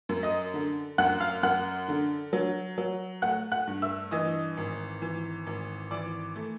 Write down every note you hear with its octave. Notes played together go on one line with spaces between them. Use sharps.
F#2
D#5 D#6
D3
F#2 F#5 F#6
F5 F6
F#2 F#5 F#6
D3
F#3
F#3
A3 F#5 F#6
F#5 F#6
G2
E5 E6
E3 D#5 D#6
G#1
E3
G#1
E3 D5 D6
A3